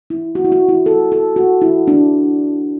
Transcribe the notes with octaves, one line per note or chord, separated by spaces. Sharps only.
E4
F#4
E4
F#4
E4
A4
A4
F#4
E4
D4